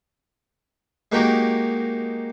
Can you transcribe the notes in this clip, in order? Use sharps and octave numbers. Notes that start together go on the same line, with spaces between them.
G#3 A#3 D#4 F#4 G4 A#4